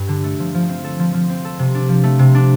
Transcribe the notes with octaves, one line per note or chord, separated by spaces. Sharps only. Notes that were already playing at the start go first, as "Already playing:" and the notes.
Already playing: G2
D3
A3
F3
F3
C4
A4
F3
F3
C4
A4
C3
D4
F3
A3
C3
D4